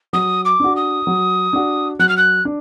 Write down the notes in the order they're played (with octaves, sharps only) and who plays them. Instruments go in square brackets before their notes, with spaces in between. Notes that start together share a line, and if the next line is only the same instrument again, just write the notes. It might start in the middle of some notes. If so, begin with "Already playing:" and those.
[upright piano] F#3 [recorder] D#6
[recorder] D6
[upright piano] D4 F#4
[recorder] D#6
[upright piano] F#3
D4 F#4
[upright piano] F#3 [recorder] F#6
[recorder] F6
F#6
[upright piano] D4